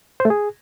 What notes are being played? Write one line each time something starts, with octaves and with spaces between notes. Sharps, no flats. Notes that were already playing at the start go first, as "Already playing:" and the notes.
C5
A3
G#4